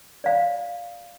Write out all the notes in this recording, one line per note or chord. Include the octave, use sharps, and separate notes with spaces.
D5 F5